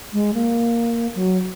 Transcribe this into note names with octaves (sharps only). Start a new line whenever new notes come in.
G#3
A#3
F#3